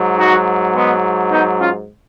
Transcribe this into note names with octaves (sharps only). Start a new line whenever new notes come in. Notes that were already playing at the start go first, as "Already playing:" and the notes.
Already playing: G#2 F#3
D#4 F#4
G#3 B3
B3 D#4
C#4 F4